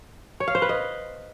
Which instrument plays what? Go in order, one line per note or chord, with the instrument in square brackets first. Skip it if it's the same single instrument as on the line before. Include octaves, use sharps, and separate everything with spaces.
[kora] C#5
F5
C5
B4
D#5